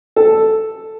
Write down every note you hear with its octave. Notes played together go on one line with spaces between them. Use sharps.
A4